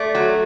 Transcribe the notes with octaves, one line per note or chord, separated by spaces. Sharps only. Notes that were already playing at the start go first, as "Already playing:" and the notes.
Already playing: A3 D5
F#3